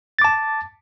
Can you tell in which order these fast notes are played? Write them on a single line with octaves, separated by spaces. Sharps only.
A6 D6 A5